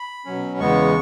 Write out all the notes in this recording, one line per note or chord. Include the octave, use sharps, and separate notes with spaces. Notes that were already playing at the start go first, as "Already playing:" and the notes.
Already playing: B5
B2 F#3 C#4
E2 C#3 G#3 B3 C#6